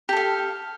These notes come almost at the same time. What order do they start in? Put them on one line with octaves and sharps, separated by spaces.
G4 A4 F5